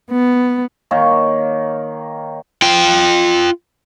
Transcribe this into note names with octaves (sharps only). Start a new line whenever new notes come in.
B3
D#3 A#3 C#5
F4 G5